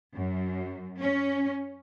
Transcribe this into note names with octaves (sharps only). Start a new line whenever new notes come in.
F#2
C#4